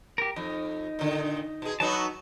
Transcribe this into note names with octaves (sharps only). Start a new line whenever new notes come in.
G4 A#4
F2 D#4
A#2 D3 D#3
B2 G#4
F#3 B3 D#4 F#4 A5